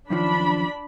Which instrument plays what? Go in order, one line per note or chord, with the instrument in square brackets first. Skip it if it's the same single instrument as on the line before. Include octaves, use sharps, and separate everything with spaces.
[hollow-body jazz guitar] F#2 D#3 F3 [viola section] D4 B5